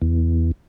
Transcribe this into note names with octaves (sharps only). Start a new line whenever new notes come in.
E2